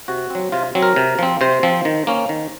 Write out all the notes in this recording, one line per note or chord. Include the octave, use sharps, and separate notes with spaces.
C3 F#4
F#3 C4
C3 F4
F#3 C4
A#4
C3
F3 C4
C3 C5
F3 C4
D#3
A#3 C#4
D#3